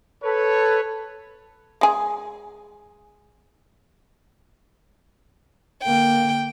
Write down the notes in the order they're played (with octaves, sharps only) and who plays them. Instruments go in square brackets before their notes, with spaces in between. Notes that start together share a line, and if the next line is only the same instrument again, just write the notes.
[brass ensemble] A4 B4 C#5
[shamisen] G#3 G#4
[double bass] D3 A#3 [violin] G5